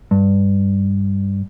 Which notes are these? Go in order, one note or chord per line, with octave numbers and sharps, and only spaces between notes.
G2